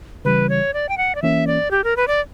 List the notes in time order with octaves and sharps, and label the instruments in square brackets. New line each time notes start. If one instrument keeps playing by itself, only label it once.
[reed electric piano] C#3 E3 G3 [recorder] B4
[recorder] C#5
D5
G5
F#5
D5
[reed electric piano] E3 A#3 C#4 [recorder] E5
[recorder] D5
G4
A#4
B4
D5